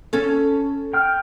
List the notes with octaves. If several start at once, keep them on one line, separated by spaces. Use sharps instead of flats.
C#4 A4
G5 F6